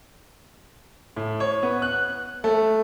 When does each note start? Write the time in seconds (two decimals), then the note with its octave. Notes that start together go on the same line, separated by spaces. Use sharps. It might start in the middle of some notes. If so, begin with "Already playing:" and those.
1.17 A2
1.40 C#5
1.63 B3
1.82 F#6
2.44 A3